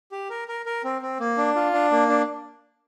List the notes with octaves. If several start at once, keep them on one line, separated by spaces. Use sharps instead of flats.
G4
A#4
A#4
A#4
C4
C4
A#3
D4
F4
D4
A#3
D4